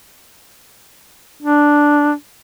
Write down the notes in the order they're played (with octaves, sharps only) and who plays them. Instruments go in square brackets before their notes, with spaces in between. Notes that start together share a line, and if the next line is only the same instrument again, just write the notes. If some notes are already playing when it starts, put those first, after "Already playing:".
[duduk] D4